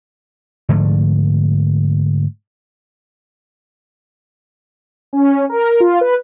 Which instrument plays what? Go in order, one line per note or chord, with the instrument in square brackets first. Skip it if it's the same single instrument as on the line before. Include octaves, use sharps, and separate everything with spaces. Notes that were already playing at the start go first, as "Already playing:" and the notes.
[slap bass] G#2 D3 F3 A3
[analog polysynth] C#4
A#4
F4
B4